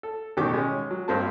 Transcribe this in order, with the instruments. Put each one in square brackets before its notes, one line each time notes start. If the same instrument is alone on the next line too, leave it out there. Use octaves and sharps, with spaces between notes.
[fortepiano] A4
A1 B2 D#3 F#4 G4 D6
G#3 C#4
F#3
G#1 G2 A#3 C4 G4 A5